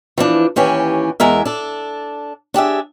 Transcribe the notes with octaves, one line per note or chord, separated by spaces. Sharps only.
E3 F3 D4
D#2 E3 C#4 G4
E2 G#3 A#4 E5
D4 A4
D4 G4 G#4 E5